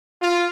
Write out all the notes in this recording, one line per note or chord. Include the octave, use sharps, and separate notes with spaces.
F4